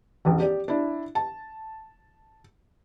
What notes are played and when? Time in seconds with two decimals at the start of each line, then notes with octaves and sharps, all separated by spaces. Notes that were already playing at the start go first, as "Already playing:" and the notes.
0.25 E1 A1
0.40 G4 D5
0.68 D4 E4
1.15 A5